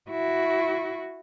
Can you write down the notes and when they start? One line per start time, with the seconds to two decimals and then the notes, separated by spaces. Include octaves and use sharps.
0.10 E4 F#4